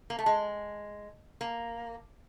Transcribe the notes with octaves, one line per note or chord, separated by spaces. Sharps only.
A#3
A3
G#3
A#3